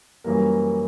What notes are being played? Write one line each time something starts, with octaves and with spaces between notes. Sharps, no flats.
F#2 E3 G3 A#3 A#4